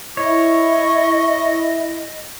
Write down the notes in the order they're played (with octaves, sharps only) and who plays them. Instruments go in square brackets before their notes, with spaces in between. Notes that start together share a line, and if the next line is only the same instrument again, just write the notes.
[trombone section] E4 [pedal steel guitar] C#5 [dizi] D#5 [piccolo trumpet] C#6